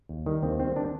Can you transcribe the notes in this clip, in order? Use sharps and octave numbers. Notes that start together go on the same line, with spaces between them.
D#2
D#3 G3
D#2 C4
D#3 G3 C4
D4